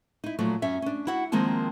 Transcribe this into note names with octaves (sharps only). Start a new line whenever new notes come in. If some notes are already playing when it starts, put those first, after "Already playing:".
D#4 E4
A#2 F3 F#3 A3
F#2 C#4 E5
C#4 D4
E4 F#4 F#5
D#3 F3 G#3 A#3 C4 A5